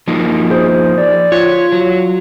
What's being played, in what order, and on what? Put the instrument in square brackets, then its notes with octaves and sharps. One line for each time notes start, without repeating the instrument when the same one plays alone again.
[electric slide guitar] F3 A#3 D#4
[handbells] G#4 C5
D5
[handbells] F4 [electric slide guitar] C#5
[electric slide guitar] F#3